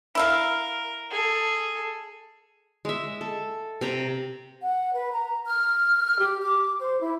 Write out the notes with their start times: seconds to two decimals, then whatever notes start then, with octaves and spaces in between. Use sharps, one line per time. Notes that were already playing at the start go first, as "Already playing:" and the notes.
0.15 E4 A#4 E5 F5
1.11 G#4 A4
2.85 G#3 E5
3.21 A4
3.81 C3 G5 A#5
4.61 F#5
4.94 B4
5.12 A#5
5.45 F6
6.19 G4
6.41 D6
6.79 C5
7.00 E4